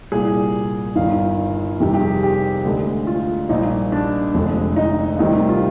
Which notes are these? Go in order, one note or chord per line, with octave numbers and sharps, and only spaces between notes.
C2 A#2 G3 G#4
G1 G2 D#3 F5
F2 C3 D#3 G3 G4
G4
G#4
G4
D2 D3 G#3
F4
A#1 A#2 G3 D#4
D4
F1 F2 D3 G#3
D#4
D2 C3 D#3 G3
F4